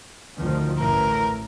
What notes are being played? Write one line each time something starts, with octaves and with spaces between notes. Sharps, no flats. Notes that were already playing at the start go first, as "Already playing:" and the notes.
D2 D#3 F3
A1 A2 A#4